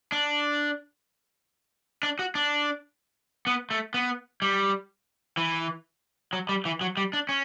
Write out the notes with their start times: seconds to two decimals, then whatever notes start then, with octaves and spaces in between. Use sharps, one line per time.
0.12 D4
2.03 D4
2.19 F#4
2.35 D4
3.47 B3
3.71 A3
3.94 B3
4.42 G3
5.37 E3
6.33 F#3
6.49 G3
6.65 E3
6.81 F#3
6.97 G3
7.13 D4
7.29 C#4